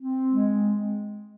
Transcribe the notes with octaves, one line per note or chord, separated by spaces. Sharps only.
C4
G#3